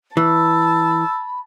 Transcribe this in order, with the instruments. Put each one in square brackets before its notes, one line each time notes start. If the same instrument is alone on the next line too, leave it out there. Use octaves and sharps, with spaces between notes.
[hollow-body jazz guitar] E3 [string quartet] A5 [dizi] B5 [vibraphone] E6